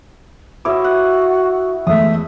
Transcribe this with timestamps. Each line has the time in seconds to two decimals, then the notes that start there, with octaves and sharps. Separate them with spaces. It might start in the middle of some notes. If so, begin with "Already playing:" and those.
0.65 E4 F#4 C#5 D#5 D6 E6
0.84 F#5
1.87 E2 G#3 A3 E5 D#6